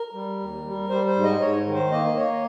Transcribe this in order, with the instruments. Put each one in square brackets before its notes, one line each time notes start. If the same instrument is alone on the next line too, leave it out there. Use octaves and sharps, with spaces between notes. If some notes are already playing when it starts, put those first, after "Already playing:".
Already playing: [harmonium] A#4
G3
D#2
G3
G3 C5
C5
G#2
D#5
G#2 C#5
D#3
C5
A#3 D#5
A#3 C#5